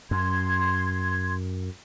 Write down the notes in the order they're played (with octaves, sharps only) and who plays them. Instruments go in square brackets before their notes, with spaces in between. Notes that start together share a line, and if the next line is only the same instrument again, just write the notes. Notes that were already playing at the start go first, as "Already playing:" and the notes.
[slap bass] F#2 [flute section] C6 G#6